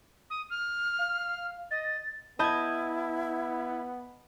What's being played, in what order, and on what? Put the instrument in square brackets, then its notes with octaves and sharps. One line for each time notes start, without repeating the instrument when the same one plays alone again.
[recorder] D#6
F6
[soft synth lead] F5
[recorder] D#5 [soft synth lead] A6
[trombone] B3 [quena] E4 [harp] D#5 G#6 [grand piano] A5 B5 G6